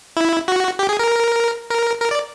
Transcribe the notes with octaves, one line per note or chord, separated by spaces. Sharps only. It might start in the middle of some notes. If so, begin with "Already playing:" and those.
E4
F#4
G4
G#4
A#4
A#4
A#4
D5